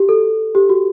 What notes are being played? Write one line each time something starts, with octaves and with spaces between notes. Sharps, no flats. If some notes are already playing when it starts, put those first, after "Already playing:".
Already playing: F#4 G4
A4
G4
F#4